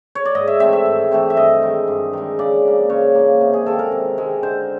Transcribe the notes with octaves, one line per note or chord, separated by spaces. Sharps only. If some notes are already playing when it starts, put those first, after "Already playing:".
C#5
D5
G#2 D#5
E5
E3 A3 C4 E5
E5
G#2
E3 A3 C4
E5
G2 D#5
D#3 G#3
G2
D#3 G#3
C#3 D5
F3 A#3
C#3 C#5
F3 A#3
C3
G#4
D#3 G#3 C4 A4
A#4
C3
D#3 G#3 C4
D3 C5